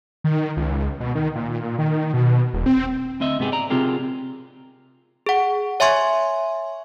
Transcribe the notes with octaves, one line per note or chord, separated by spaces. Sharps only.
D#3
C#2
B2
D#3
A#2
D#3
B2
E1
C4
D2 C4 D#5 E5
G#2 C3 B3 G4 G#4
D5 A#5
C3 C4 F4 G4 G#4 A#4
G#4 F#5
C#5 E5 G#5 C6 C#6 G#6